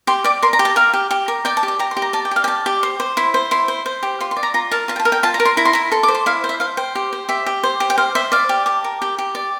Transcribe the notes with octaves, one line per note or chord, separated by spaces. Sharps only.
G4 C6
D5 D6
A#4 C6
A#5
G4
A5
A#4 F5
G4
G4
A#4
D5 G5
A5
G4
A5
G4 A#5
C6
G4
A#5
D5 A5
G5
G4 F5
G5
D5 A5
G4
C5
C5
E4 C6
C5
E4 C6
C5
C5
G4
F4 C6
C6
D5
A#5
F4 A#5
A#4 A5
F4 A5
G5
A5
A#4
G5
F4 A5
A#5
A#4
C6
E4 A#5
C6
E4 A#5
A4 C6
D6
C5
C6
E4 F5
C5
E5
C5 F5
C5 G5
G4
C5
G4 E5
G4
C5
G4
G5
C5 F5
C5 E5
D5 F5
G4
G4 A5
A#4
G4
G4
D5